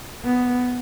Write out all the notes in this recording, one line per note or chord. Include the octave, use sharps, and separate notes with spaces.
B3